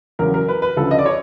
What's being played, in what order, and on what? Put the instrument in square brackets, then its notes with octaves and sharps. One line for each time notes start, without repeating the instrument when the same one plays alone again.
[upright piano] E2 C#3 F#3 A#4
A#4
B4
B4
D2 C#3 F3 A4
D#5
D5
C#5